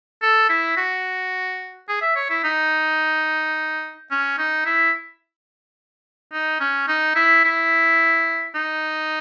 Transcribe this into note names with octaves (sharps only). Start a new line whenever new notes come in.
A4
E4
F#4
G#4
E5
C#5
E4
D#4
C#4
D#4
E4
D#4
C#4
D#4
E4
E4
D#4